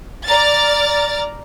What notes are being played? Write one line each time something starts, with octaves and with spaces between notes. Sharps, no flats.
D5 A#5 F6 A6